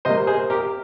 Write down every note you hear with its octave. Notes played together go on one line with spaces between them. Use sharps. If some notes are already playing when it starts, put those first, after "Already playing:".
C3 G3 A#3 C5 D#5
G#4 C5
G4 A#4